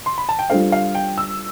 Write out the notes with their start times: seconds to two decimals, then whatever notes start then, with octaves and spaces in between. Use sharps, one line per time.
0.06 C6
0.18 B5
0.29 A5
0.39 G5
0.50 G3 D4 F4 A4 C5 F5
0.72 F5
0.95 G5
1.18 E6